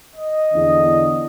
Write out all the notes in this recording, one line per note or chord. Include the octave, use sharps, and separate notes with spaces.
D#5
E2 D3